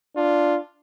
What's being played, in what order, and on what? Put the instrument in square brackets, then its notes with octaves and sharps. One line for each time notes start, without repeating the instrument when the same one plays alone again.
[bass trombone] D4 [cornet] F4